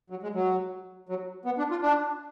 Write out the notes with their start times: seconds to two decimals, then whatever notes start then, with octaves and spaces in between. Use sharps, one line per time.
0.10 F#3
0.23 G#3
0.34 F#3
1.09 F#3
1.45 B3
1.58 D4
1.71 F4
1.82 D4